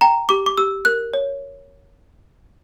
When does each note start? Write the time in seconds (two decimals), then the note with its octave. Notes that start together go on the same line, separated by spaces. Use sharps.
0.01 G5 A#5
0.29 G4 D6
0.46 D6
0.57 G4 E6
0.85 A#4 F#6
1.14 C#5